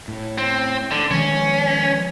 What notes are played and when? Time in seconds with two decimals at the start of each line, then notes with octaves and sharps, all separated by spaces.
0.08 A2
0.38 C4
0.91 D3
1.11 D#3 F3 G#3 C#4